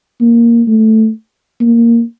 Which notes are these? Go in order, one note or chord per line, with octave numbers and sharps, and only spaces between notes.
A#3
A3
A#3